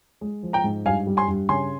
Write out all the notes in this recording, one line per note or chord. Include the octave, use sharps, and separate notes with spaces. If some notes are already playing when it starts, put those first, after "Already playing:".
G#3
F3
G5 A#5
G#2
G2 F5 G#5
G3
G#5 C6
G2
C#3 G#5 C6